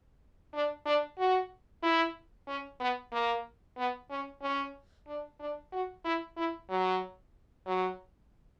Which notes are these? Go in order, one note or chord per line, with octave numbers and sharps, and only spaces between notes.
D4
D4
F#4
E4
C#4
B3
A#3
B3
C#4
C#4
D4
D4
F#4
E4
E4
F#3
F#3